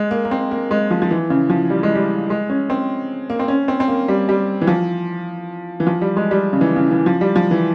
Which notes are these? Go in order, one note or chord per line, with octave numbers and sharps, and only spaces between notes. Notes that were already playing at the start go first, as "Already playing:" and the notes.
Already playing: G#3
A#3
A#3
C4
A#3
G#3
F3
F3
E3
C#3
F3
G3
G#3
G3
G#3
C#4
C4
A#3
C4
C#4
C4
C4
A#3
G3
G3
E3
F3
E3
F3
G3
G#3
G3
C#3
E3
C#3
E3
F3
G3
F3
E3